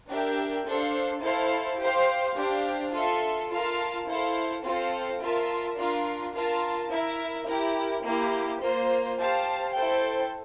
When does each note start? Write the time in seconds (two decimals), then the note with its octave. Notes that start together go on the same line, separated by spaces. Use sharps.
0.09 D4 G4 A#4 E5 G5
0.66 D4 A4 C5 F5
1.23 E4 A4 C5 F5 A5
1.80 G4 C5 F5
2.36 D4 G4 C5 F5
2.93 F4 A4 E5
3.51 F4 A#4 F5 A5
4.07 E4 A4 C5 F5
4.64 C4 F4 A4 C5 F5
5.21 F4 A#4 E5 A5
5.77 D4 F4 A#4 F5
6.35 F4 A#4 F5 A5
6.92 E4 A#4 E5
7.48 E4 G4 A#4
8.05 A#3 E4 G4
8.62 A#3 F4 C5
9.19 G4 C5 F5 A5
9.76 E4 A4 C5 G5